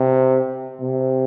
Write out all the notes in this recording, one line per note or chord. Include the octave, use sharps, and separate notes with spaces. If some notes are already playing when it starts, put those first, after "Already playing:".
Already playing: C3
C3